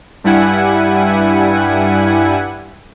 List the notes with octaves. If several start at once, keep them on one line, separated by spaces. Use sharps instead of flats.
G2 G3 E4 F#5 G#5